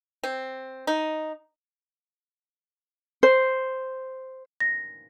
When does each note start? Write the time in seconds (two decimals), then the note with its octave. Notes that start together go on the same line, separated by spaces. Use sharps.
0.24 C4
0.87 D#4
3.23 C5
4.60 A#6